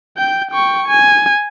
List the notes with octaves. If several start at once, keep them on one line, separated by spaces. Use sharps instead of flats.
G5 G6
G5 C#6
G#5